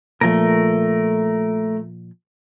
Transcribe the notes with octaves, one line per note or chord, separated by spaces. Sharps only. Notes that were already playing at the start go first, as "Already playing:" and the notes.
A#2 F3 A3 A#4